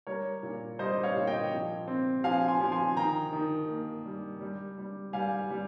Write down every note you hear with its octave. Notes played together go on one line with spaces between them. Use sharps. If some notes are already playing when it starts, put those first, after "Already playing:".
G3 A#4 C#5
A#2
G3 C5 D#5
C#5 F5
A#2
D#5 G5
F3
C4
F3 F5 G#5
G#5 C6
F3
G#5 C6
D#3 G5 A#5
D#3
A#3
G3
G3
G3
G3 F5 G#5
G3